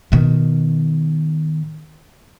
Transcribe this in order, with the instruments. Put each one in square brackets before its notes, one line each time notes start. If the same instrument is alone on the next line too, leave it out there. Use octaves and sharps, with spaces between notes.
[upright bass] B2 D#3